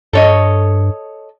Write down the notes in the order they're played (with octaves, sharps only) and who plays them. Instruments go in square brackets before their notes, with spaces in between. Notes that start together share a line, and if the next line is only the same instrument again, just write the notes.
[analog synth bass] G2 [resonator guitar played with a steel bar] A4 C#5 D#5